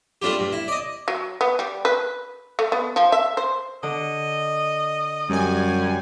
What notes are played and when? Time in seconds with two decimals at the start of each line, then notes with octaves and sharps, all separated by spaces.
0.22 G3 A3 D4 F4 G4
0.39 G2
0.53 E4
0.68 D5 D#5
1.08 F#3
1.41 B3
1.59 G3
1.85 B4
2.59 A3
2.72 B3
2.96 F3
3.12 E5
3.37 C5
3.83 D3 D#5
5.30 F#2 G3 G#5